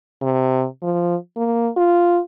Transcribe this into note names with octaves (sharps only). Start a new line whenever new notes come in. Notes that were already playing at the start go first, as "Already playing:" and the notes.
C3
F3
A#3
F4